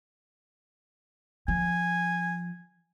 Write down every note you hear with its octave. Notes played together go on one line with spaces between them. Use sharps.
F3 G#5